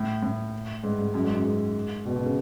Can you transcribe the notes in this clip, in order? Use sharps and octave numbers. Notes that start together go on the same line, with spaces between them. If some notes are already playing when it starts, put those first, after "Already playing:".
Already playing: A2
A2
G#2
G#2
F#2
G#2
F#2
G#2
B2
B2
C#3